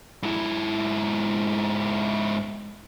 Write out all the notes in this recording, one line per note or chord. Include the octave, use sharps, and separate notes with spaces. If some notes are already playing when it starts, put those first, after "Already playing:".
G#2 E4